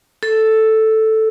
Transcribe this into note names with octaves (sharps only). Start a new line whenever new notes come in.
A4